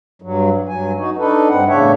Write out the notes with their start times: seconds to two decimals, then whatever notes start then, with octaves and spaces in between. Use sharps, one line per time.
0.22 G2 F#3
0.68 G2 F#3 G#5
0.98 D#4 F#4
1.18 D4 D#4 A4 B4
1.49 G2 C4 F#5
1.68 E2 A2 C#3 D4 C#5 E5